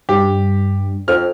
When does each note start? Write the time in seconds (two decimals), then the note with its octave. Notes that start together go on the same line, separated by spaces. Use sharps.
0.09 G2 G4
1.08 F2 F6